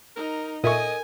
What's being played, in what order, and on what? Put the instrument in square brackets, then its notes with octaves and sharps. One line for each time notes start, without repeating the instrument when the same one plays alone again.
[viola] D#4 [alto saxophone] A#4
[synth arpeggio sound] A#2 E5 C#6 [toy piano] A4 A#4 [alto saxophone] D#5 [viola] G#5